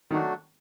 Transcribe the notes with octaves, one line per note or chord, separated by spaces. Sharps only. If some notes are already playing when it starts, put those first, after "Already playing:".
D#3 F#3 A3 D4 F#4